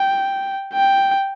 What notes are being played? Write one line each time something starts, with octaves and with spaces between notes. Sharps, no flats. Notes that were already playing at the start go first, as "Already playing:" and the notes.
Already playing: G5
G5